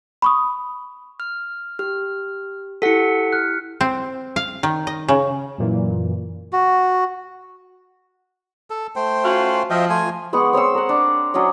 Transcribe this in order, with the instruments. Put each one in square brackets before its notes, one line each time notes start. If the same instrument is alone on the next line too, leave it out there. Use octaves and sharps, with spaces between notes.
[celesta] B5 C#6 D#6
[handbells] F6
[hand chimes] G4 [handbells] F6
[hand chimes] E4 G4 [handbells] A4 F#5 [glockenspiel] B6 C#7
[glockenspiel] F6 F#6
[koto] C4
F5
D#3
D#5
C#3
[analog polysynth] F#2 A#2 E3
[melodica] F#4
A4
A3 C5 G5
[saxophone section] C#4 F4 F#4
[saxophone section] F3 [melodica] D#5 E5 G5
[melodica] A3 F4 G#5
[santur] G#3 B3 F#5 C#6
C4 C#5 C6 E6
A#4 F#5
D4
F#3 C#4 D4 D#5